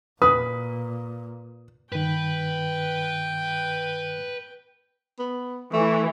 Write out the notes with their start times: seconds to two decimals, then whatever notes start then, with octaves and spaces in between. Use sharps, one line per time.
0.22 A#2 B4 D#6
1.92 G2 D#3 B4 G5
5.19 B3
5.73 E3 A3